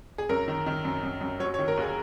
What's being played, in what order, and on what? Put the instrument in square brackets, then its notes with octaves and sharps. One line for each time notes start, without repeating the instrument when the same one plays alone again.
[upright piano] G#4
F#2 A#4
D#3
D#3
F#2
F#2
F#2
F#3 C#5
C#5
D#3
A#4
D#2 G#4